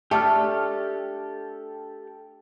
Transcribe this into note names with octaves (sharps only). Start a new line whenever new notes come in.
A3 D4 G4 A4 F6